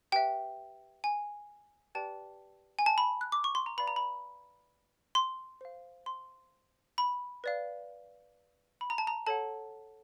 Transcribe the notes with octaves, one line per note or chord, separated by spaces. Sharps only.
G4 B4 E5 G5
G#5
G4 B4 D5 G5 A5
G#5
A5
B5
F#6
D6
C#6
C6
A#5
B4 D5 F5 B5
A#5
B5
C6
C5 F5
C6
B5
B4 D5 F5
B5
A#5
A5
A#5
A4 C#5 F#5 A5